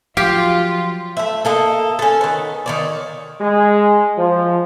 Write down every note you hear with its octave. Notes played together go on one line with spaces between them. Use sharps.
F3 F#3 F4 G4 F5
A3 E5
A#3 A4 D#5
C#4 A4
D#3 B3
D#3 C#5 D5
G#3
F3